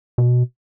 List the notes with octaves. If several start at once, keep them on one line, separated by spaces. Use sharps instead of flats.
B2